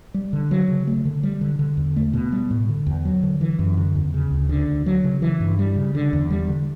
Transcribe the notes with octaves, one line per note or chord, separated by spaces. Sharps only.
G3
D3
F#3
C#3
A3
D3
G3
D3
D3
E2
A3
B2
G3
A2
D3
E2
F#3
D3
E3
F#2
D3
E2
C#3
D2
D3
D2
F#3
C#3
E3
G2
G3
C#3
D3
E2
G3
D3